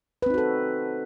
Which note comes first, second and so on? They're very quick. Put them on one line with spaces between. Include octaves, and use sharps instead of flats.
B4 C4 D#4 F#4 A4